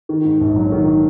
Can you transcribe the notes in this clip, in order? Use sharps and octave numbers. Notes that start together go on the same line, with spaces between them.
D#3
G#2
A#1
F#3
D#3